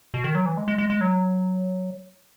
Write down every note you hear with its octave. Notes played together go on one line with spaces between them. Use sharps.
B2
D#3
F#3
E3
G#3
G#3
G#3
G#3
F#3